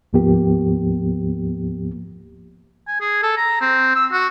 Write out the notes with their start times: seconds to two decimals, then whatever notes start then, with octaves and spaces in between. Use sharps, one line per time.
0.13 D2 G#2 F3 A#3 B3 G4
2.88 G#5
3.01 G#4
3.23 A4
3.37 A#5
3.61 C4
3.96 E6
4.12 F#4